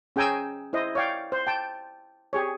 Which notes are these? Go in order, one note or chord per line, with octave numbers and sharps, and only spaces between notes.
C#4 G#4 G5 G#5 A#5 E6
E4 C5 D#5
C#5 D5 F5 G5
C5
G5 A5
G4 G#4 C#5